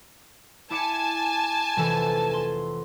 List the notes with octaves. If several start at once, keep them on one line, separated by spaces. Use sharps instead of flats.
E4 G#5 A5 D6 C#7
F1 E3 A4
C6